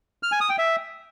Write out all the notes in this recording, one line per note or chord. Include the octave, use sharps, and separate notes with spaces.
F6
G#5
D#6
G5
E5